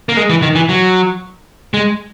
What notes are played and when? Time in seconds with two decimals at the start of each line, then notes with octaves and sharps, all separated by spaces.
0.09 A#3
0.17 G#3
0.30 E3
0.42 D#3
0.55 E3
0.69 F#3
1.74 G#3